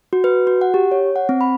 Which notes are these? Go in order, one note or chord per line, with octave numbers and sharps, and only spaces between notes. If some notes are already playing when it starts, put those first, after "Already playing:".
F#4
B4
F#4
F#5
G4
C#5
F#5
C4
B5